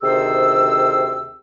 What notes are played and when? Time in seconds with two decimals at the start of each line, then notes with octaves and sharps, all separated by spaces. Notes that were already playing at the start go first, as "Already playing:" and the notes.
0.03 D2 C3 D#3 G#4 C5 E6